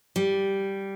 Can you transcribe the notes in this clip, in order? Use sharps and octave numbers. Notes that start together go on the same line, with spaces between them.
G3